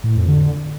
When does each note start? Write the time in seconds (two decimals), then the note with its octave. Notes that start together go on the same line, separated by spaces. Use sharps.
0.04 A2
0.16 F2
0.27 D3